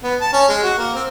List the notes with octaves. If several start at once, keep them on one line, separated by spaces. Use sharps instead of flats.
B3
A5
C#4
G#3
F#4
A#3
C4